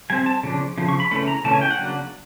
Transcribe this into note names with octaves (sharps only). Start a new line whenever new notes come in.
G3 C4 G#5
A5
C#3 F3 D4
C#3 F3
C#6
B5
C#3 E3 A3 C#4 B5
A#5
C#3 E3 A3 C#4 A5
G#5
G5
F#5
C#3 F#3 A#3 D4